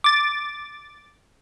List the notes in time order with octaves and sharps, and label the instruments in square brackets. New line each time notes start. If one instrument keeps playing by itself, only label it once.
[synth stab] D6 A6